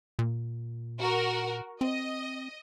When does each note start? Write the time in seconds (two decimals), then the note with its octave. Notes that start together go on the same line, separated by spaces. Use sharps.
0.19 A#2
0.99 F#4 A#4
1.81 C4 D#5